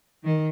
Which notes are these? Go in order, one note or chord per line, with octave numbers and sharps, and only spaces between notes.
D#3